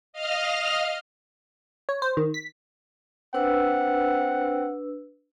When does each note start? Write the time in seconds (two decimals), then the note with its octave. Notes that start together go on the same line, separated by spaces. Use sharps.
0.13 D#5 F5 F6
1.89 C#5
2.02 C5
2.17 D#3
2.34 B6
3.34 C4 D4 B4 F#5 E6